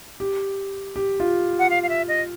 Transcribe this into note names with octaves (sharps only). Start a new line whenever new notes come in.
G4
G4
F4
F#5
F5
F5
E5
D#5